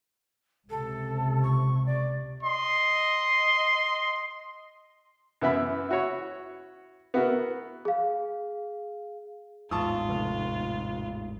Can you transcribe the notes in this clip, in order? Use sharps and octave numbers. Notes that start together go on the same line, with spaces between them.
C#2 C3 A4
C#6
D5
D#5 C6
F#2 E3 B3 E4 E5 B5
E4 F#4 C#5
B3 E4 F#4 A#4
G#4 F5
A1 E2 G#2 F4 A5 C#6 D#6
F1